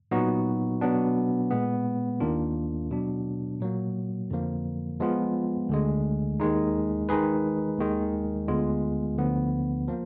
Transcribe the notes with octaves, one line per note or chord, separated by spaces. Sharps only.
A#2 F#3 B3 D#4 F#4
B2 F#3 B3 D4
A#2 G#3 B3
D#2 D#3 A#3 D4 F4
B2 F#3 D4
A#2 F#3 A#3
F2 D3 F3 A#3
F3 G#3 B3 F4
D2 D3 G#3
D#2 D#3 G#3 D#4
D#3 G#3 D#4 G#4 B4
D#2 D#3 G#3
D2 D3 G#3 B3 F4
D2 D3 F3 B3
F3 A#3